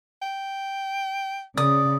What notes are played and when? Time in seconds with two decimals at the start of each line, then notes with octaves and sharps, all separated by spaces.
0.22 G5
1.57 C#3 D5 D#6